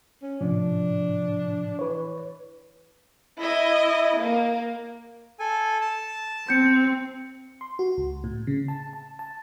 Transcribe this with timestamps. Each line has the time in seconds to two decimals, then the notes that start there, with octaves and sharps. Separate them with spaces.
0.23 C#4
0.41 A2 C3 F3 D4
1.79 E3 B4 C#5
3.41 E4 D#5
4.19 A#3
5.39 A4 G#5
5.81 A5
6.49 C4 G6 C#7
7.61 C6
7.79 F#4
7.97 C#2
8.24 A2
8.47 C#3
8.68 A5
8.93 A5
9.19 A5